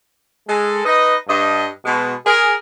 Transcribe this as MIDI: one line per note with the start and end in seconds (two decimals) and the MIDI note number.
0.48 0.84 56
0.48 0.84 69
0.85 1.15 63
0.85 1.15 71
0.85 1.15 75
1.28 1.66 43
1.28 1.66 75
1.85 2.14 47
1.85 2.14 56
2.26 2.54 68
2.26 2.54 70